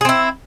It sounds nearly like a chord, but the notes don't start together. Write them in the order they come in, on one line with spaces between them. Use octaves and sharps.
G#4 C4 E4